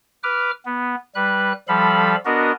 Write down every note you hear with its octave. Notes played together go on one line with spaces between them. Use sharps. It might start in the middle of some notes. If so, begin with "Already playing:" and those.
B4 D6 F6
B3
G3 B4 F#6
F3 G3 A4 F5 B5
B3 D4 F#4 A#4 D#5